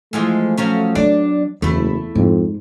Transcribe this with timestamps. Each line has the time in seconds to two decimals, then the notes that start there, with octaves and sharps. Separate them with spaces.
0.13 E3 F3 G#3 A3
0.58 F3 F#3 C#4
0.95 F#3 B3 D4 D5
1.62 F#1 E2 A3 E4
2.15 F2 G#2